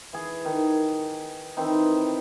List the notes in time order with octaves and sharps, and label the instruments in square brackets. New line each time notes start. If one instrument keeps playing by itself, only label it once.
[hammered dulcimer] E3 G#4
D#3
D#3 E3 C4 D#4